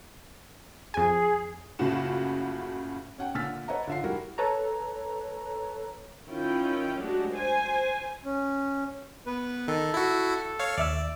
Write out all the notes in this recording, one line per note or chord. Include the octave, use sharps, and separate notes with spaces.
F2 G#4 G#5
F#1 A2 C#3 F4 F#4 E7
C#4 F#5 G5
A#2 D3 E6 F6 A6 B6
B4 C#5 D#5 E5 F#5 A#5
D3 F4 E5 F5 C7
G3 E4 F#4 A#4
A4 B4 C#5 A#5
D#3 C#4 E4 F4 G5
F#3 G#3 A3 D4 F#4 G4
C5 G#5
C#4
B3 B4
D#3 A4
E4 F#4
C#5 F5
D#2 D5 E5 E6